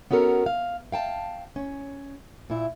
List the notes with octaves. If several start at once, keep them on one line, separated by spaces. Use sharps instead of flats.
B3 C#4 F#4 A4 A#4
F5
F5 G5 A5
C#4
A#2 E4